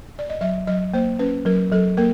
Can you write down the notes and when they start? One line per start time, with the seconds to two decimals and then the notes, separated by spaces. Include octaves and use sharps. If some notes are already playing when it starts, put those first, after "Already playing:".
0.19 D5
0.30 D#5
0.41 F#3 E5
0.67 F#3 D#5
0.94 A#3 C5
1.19 C#4 B4
1.45 F#3 A#4
1.71 F#3 A4
1.97 A#3 A#4